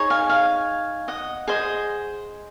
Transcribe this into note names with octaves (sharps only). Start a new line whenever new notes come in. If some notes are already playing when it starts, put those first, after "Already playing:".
Already playing: D#4 G#4 C#5
F5 G#5
F5 G#5
D#5 F#5
G#4 C5 D#5